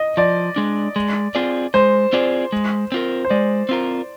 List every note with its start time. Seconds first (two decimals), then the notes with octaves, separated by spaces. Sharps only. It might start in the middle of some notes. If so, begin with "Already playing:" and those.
Already playing: D#5
0.17 F3 D5
0.56 G#3 D4
0.96 G#3
1.35 C4 F4 G#4 D5
1.74 G#3 C5
2.13 C4 F4 G#4 D5
2.52 G#3
2.92 C4 F4 A#4
3.25 C5
3.30 G#3 D5
3.69 C4 F4 A#4